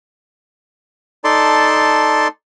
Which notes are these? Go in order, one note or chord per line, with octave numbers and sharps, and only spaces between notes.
D#4 A4 D5 A5 C6